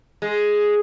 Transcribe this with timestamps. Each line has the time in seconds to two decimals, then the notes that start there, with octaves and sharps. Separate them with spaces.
0.22 G#3